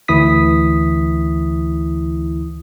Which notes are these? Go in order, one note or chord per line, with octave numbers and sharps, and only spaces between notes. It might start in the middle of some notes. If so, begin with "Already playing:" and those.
D2 E3 E4 D#6 B6